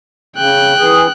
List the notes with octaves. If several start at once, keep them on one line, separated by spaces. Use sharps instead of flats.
C#3 G5 F#6
E3 G#4